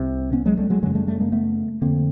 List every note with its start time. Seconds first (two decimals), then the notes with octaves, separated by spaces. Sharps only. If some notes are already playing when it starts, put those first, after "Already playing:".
Already playing: C2 C3
0.33 B3 C#4
0.45 F#3 G#3
0.57 G3 A3
0.70 F#3 G#3
0.83 F#2 C#3 F#3 G#3
0.95 G3 A3
1.08 G3 A3
1.20 G#3 A#3
1.32 A3 B3
1.82 F2 D3 A#3 C4